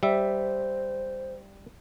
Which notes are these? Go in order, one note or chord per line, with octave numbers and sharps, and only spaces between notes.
G3 C5 E5